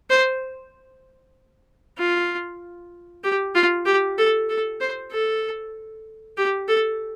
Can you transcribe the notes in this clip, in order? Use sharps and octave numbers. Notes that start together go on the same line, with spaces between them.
C5
F4
G4
F4
G4
A4
A4
C5
A4
G4
A4